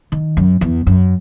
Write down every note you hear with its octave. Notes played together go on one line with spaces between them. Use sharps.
D#3
F#2
E2
F#2